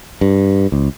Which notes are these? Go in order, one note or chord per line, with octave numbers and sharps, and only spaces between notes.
G2
C#2